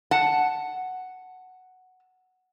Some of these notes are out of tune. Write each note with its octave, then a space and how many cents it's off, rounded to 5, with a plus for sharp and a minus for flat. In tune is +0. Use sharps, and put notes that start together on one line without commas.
F#5 +0 A5 +5